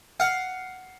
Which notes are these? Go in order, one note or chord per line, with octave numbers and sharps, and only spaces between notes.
F5 F#5